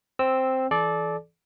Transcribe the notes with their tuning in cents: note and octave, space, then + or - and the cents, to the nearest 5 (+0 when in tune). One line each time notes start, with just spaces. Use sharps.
C4 +0 E6 -5
E3 +0 A4 -35 D5 +0